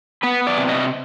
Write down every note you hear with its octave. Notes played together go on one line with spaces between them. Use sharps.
B3 B4
D5
C3
D#5